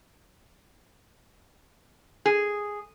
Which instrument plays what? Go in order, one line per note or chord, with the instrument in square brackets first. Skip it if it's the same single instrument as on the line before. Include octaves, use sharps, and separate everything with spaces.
[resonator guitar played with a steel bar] G#4